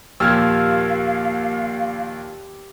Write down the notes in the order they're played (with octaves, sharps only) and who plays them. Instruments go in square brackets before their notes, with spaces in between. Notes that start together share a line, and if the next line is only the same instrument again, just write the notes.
[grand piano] D#2 A#2 F3 [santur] G4 [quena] F5 [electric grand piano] E6 F6 G#6